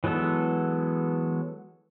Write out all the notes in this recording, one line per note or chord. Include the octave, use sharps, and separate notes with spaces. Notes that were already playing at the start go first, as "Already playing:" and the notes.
E3 F#3 G#3 B3 A4